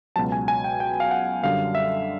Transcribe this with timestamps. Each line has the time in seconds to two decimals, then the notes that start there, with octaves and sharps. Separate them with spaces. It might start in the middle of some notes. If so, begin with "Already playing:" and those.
0.16 C#2 B2 F#3 A5
0.32 G#5
0.48 G#5
0.64 G5
0.80 G5
1.00 F5
1.11 F#5
1.43 F#2 D3 G3 F5
1.75 E5